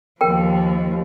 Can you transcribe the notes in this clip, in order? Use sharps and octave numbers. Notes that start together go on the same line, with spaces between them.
D#2 F3 A#4 G5